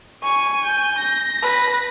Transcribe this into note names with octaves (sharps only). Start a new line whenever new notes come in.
G#5 C#6
G6
A#6
B4